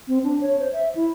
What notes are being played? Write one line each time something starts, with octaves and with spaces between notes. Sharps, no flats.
C4
D4
C#5
C5
E5
E4